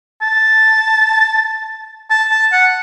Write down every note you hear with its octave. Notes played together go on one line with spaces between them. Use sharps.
A5
A5
A5
F#5